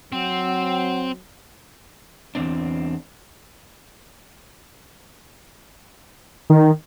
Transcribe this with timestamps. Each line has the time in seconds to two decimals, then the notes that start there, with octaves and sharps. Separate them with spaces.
0.13 F#3 C4 F#5
2.35 E2 G2 C4 D4
6.50 D#3